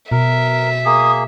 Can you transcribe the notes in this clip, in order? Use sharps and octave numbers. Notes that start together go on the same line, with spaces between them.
B2 A#4 E5
A#3 G#4 D#6